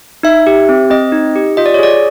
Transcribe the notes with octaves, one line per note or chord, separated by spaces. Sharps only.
D#4 E5
G4
C4
C4 D#5
D#4
G4
F4 D#5
D5
C#5
G#4 D5